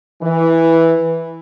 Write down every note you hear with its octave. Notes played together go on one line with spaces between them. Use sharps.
E3